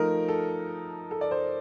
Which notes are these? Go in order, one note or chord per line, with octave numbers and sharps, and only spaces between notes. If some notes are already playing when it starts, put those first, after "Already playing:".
Already playing: F3 A3 D#4 A#4
A4
A4
D5
C5